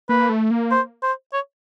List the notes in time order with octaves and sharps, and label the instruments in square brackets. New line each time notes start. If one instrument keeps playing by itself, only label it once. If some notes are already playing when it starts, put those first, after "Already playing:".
[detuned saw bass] A#3 [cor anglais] B4
[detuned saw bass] A3
A#3
[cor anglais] C5
C5
C#5